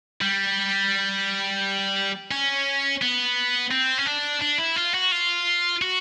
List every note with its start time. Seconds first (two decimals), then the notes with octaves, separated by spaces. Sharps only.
0.21 G3
2.31 C#4
3.02 B3
3.71 C4
3.99 C#4
4.07 D4
4.42 D4
4.59 E4
4.76 F4
4.94 F#4
5.12 F4
5.82 F#4